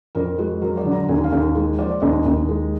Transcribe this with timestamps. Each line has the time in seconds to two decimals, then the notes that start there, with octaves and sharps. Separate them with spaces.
0.15 F2 A#4
0.38 G#3 F#4
0.62 F#3 A#4
0.77 D5
0.85 D3
0.93 A#5
1.08 D#2 G#5
1.24 F5
1.32 D#2
1.39 A#4
1.55 G#3 G#4
1.79 F3 D5
2.02 D#2 D#5
2.26 D#2
2.49 G#3